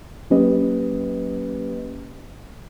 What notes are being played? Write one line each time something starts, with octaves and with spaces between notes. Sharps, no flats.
F#3 A#3 C#4 G4 B4 D#5